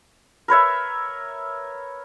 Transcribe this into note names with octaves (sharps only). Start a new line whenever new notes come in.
A#4 B4 C#5 E5